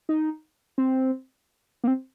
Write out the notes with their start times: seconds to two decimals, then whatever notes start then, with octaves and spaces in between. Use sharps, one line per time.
0.09 D#4
0.78 C4
1.84 A#3
1.87 C4